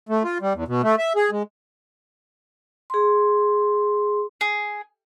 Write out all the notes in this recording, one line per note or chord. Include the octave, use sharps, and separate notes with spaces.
A3
F4
G3
E2
B2
A3
E5
G#4
G#3
G#4 C6
G#4